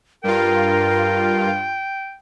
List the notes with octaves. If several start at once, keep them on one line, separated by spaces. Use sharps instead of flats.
G2 F4 A#4 G5